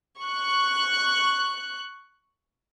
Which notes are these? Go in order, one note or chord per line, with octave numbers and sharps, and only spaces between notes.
C#6 F#6